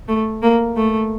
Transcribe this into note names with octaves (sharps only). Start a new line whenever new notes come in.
A3
A#3
A3